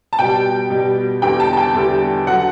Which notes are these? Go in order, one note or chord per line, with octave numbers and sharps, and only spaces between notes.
A5
B2 G3 G5
B2 G3
E2 D3 G3 G5
A5
A5
G5
E2 D3 G3
D3 F#3 F#5